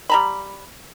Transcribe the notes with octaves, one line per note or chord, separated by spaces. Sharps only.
G3 A#5 B5